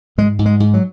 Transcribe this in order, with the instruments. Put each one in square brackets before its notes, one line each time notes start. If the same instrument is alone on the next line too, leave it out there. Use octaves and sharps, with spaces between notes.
[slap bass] G#2 G#3
G#2
G#3
G#2
F#3